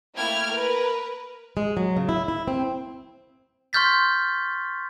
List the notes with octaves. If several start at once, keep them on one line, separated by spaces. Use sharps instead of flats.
A3 A#3 E4 G5 F6 G#6
A#4 B4
G#3
F#3
C#3
E4
E4
C4
C6 C#6 F6 G6 A6 B6